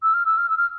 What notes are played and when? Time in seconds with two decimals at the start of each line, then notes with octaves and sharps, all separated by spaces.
0.03 E6
0.14 F6
0.26 E6
0.38 F6
0.49 E6
0.57 F6